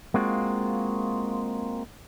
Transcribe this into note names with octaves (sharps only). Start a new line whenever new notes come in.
G#3 A#3 C4 F4 F#4